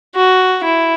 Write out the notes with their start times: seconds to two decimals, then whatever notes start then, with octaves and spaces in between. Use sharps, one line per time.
0.15 F#4
0.64 E4